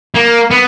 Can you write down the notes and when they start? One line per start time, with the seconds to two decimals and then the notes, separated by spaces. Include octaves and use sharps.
0.16 A#3
0.51 B3